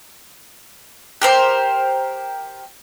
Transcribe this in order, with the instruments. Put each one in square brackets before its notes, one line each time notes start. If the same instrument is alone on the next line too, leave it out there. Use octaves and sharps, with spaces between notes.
[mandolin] G4 A#4 C5